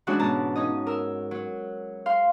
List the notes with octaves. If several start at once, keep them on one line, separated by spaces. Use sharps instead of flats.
E3 F#3 G#3 C#4 D4 F#4
G#2 B2 A5 A#5
C#4 D#4 D#5
A#4 E6
F#3
F5 C6